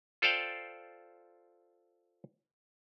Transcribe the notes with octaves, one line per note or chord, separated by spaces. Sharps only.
F4 A4 C5 D5 F5 G5